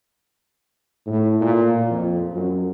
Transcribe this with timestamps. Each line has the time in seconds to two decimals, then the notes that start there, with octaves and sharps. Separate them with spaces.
1.07 A2
1.41 A#2
1.90 F2
2.33 F#2